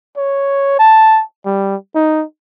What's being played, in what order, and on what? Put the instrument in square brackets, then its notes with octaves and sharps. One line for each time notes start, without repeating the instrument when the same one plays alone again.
[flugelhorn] C#5
A5
G3
D#4